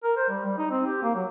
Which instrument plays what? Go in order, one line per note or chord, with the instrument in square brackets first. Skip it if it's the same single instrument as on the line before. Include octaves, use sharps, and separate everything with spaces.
[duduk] A#4
C5
G3
G3
D#4
C4
G4
A#3
F#3